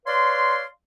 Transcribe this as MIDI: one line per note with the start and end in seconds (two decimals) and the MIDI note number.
0.06 0.63 71
0.06 0.63 73
0.06 0.63 74
0.06 0.63 77
0.06 0.63 84